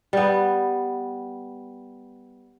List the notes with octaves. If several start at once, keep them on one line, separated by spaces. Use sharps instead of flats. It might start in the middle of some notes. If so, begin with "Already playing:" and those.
G3 B3